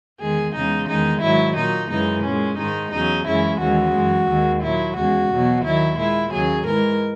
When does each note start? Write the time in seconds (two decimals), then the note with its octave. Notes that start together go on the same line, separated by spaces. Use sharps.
0.20 E2 D#3 G#3 G#4
0.54 E2 C#3 E3 G#3 D#4
0.88 E2 D#3 G#3 D#4
1.22 G#2 D#3 F#3 E4
1.56 A#2 F#3 D#4
1.90 F#2 C#3 E3 G#3 D#4
2.24 A#2 G#3 C#4
2.58 G#2 D#3 G#3 D#4
2.92 E2 C#3 F#3 D#4
3.26 F#2 C#3 E3 G#3 E4
3.60 D#2 C#3 E3 G#3 F#4
3.94 F#2 E3 G#3
4.28 D#2 D#3 G#3
4.62 A#2 F#3 E4
4.96 E2 C#3 G#3 F#4
5.31 E2 B2 F#3
5.64 D#2 D#3 F#3 E4
5.98 A#2 G#3 E4
6.32 D#2 C#3 F#3 G#4
6.66 G#2 E3 G#3 A#4